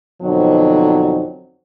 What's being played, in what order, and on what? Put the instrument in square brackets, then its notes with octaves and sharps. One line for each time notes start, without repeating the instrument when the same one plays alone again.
[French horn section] F2 B2 D3 F#3 C4 D#4